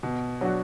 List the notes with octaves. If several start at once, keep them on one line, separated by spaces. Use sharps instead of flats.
B2
F#3 D4 F#4